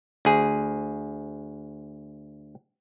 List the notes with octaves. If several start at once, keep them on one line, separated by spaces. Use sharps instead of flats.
D2 G#4